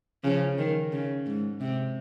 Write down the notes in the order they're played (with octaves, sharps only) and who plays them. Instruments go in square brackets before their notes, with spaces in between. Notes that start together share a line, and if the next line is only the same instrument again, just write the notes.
[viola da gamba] C#3 F3
D#3
C#3
G#2
C3